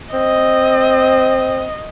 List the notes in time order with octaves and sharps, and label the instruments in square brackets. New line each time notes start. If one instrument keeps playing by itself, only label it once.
[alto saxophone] C4 [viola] D#5